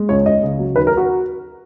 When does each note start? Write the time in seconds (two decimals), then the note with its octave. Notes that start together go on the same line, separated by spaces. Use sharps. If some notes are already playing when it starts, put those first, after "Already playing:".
Already playing: G#3
0.09 C#2 C#5
0.26 C#2 D#5
0.43 C#3
0.59 F#3
0.76 D#2 B4
0.87 A#4
0.97 F#4